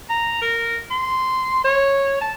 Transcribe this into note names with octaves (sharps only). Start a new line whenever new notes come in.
A#5
A#4
C6
C#5
A5